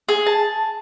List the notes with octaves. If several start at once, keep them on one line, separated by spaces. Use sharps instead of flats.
G#4
A5